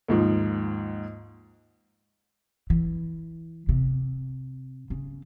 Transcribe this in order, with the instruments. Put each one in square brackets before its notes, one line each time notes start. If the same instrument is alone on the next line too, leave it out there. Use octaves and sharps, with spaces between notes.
[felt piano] D#2 G#2 F3
[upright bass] E3
C3
C#3